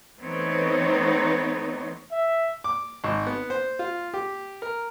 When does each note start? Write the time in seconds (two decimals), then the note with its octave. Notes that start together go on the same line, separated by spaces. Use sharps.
0.19 E3 A3 B3 C4 D#4 C#5
2.12 E5
2.64 D6
3.04 G#1
3.27 B3
3.50 C5
3.79 F4
4.14 G4
4.62 A#4